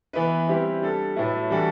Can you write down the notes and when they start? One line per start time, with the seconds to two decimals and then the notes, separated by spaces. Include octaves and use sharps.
0.13 E3 B3 E4 B4
0.47 G3 C4 E4 G4 B4
0.81 G3 D4 A4
1.16 A2 F#3 A3 E4 B4
1.50 E3 G3 D4 F#4 A4